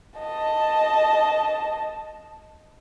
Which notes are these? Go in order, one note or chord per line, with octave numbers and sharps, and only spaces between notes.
D#5 A5